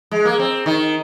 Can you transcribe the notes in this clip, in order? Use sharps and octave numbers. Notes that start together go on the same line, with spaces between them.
G#3
A#3
C4
D#3